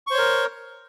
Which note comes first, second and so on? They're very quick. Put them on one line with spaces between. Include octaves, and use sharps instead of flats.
C#6 C5 C#5 A#4